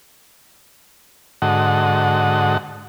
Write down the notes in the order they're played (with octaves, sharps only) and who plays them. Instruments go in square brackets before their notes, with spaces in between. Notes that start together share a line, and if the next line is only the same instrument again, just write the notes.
[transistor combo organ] G#2 D3 F#4 A4 D#5 F#5